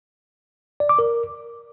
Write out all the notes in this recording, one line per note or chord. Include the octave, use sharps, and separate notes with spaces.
D5
D6
A#4